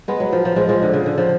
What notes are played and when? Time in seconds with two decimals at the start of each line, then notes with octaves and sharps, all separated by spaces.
0.08 G#3 B3
0.20 F#3
0.32 F3
0.45 F3
0.56 F3 G#3
0.69 F3 G#3
0.82 D3
0.93 C#3
1.06 D3
1.18 F3